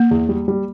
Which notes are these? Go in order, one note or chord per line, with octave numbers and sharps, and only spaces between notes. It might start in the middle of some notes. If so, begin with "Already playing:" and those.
Already playing: A#3
E2
G3
G3